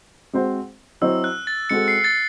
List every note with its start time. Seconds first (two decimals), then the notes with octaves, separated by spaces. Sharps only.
0.33 G#3 C4 F#4 C5
1.01 F#3 C4 E4 C5 D#5 E6
1.24 F#6
1.47 A6
1.70 G#3 C4 F#4 A4 C#7
1.88 C7
2.04 A6